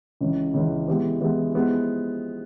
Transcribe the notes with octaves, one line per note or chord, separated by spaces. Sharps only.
C#2 C#3 E3
C#2 C#3 E3
E3 G#3 B3 E4 G4
E3 G#3 B3 E4 G4
F3 G#3 B3 E4 G4